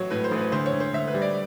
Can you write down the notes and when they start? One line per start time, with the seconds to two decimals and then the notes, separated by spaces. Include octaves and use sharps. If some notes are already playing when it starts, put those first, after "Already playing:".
Already playing: A1 F#3 C#5
0.10 A2 B4
0.24 C5
0.31 A1
0.38 B4
0.52 D2 C5
0.66 C#5
0.73 D2
0.80 C5
0.93 D2 E5
1.07 B4
1.14 G3
1.22 D5